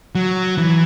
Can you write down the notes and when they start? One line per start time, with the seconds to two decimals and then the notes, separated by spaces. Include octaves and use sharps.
0.15 F#3
0.58 E3